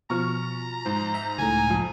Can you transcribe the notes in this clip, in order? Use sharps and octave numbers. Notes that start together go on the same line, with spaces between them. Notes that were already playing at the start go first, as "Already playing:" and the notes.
B2 F3 A#5 C#6 F6
G#2 C5
E5
C#2 A2 G#5
F2